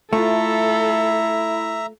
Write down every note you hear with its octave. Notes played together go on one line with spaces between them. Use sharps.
A3 E4 F4 A4 E5 A#5